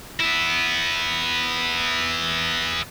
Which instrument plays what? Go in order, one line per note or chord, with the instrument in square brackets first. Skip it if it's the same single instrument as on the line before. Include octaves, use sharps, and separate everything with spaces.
[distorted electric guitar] B3 E4